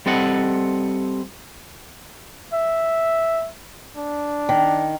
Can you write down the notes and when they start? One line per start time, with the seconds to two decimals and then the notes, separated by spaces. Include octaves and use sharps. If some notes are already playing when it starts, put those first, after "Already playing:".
0.06 G3 C4 A4 D#5 F#5
2.53 E5
3.97 D4
4.49 D#3